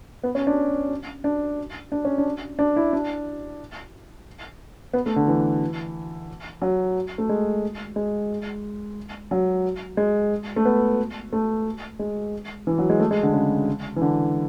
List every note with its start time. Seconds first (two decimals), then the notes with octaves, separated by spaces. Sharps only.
0.23 B3
0.35 C#4
0.47 D4
1.24 D4
1.92 D4
2.05 C#4
2.18 D4
2.59 D4
2.76 E4
2.93 D4
4.93 B3
5.06 A3
5.16 D3
5.28 E3
6.62 F#3
7.18 A3
7.29 G#3
7.96 G#3
9.31 F#3
9.97 G#3
10.56 A3
10.65 B3
11.33 A3
11.99 G#3
12.67 E3
12.78 F#3
12.90 G#3
13.00 A3
13.11 G#3
13.23 D3
13.33 C#3
13.96 E3
14.02 D3